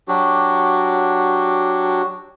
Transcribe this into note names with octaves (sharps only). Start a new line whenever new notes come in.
F#3 D4 F#4 G4